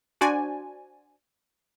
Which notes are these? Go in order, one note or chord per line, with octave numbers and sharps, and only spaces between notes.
D4 F#4 C5 D5 G#5